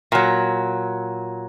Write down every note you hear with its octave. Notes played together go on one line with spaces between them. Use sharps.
A#2 F#3